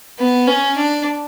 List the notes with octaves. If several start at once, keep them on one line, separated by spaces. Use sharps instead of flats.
B3
C#4
D4